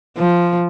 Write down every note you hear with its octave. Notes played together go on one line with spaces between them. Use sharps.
F3